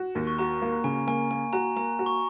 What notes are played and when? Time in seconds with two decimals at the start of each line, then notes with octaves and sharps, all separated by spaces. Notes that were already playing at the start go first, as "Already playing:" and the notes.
Already playing: F#4
0.15 D#2
0.27 C#6
0.39 F#4 A#5
0.62 A#3
0.84 C#3 G#5
1.07 A#3 G#5
1.30 A#3 G#5
1.53 F#4 A#5
1.76 A#3 A#5
1.99 F#4
2.06 C#6